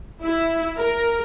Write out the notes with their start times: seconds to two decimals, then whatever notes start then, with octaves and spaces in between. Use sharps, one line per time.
0.21 E4
0.76 A#4